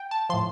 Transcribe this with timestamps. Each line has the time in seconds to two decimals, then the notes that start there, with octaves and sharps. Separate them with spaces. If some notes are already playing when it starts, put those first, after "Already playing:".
Already playing: G5
0.11 A5
0.29 A2 F3 C6